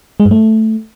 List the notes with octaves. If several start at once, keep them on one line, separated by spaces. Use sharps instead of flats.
G#3
G2
A3